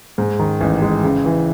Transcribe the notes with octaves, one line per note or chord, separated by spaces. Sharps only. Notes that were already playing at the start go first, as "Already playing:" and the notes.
G#2
D#3
A1
G#3
C#3
E3